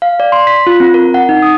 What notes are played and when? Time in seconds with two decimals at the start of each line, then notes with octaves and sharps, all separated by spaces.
0.02 F5
0.20 D5
0.32 C6
0.47 B6
0.67 F4
0.80 C4
0.94 A#4
1.14 F#5
1.29 D#4
1.42 D#6